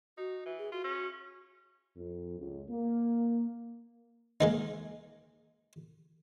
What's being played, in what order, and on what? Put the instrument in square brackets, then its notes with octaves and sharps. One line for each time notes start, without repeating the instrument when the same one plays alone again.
[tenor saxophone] D#4 [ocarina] F#4
[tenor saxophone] E3
[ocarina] G#4
[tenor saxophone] F4 [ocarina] F#4
[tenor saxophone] C#4
[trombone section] F2
C#2
A#3
[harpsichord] G#3 A#3 D#4